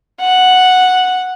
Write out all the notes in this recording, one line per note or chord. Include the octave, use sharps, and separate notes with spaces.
F#5